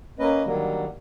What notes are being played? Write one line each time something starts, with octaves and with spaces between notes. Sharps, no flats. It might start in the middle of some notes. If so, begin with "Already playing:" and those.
A#3 C#4 B4 D#5
D3 D#3 F#3 G3 A#3